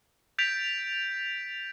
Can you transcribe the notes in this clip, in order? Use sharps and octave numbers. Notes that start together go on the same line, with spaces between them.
G6 A6 B6 D7 F7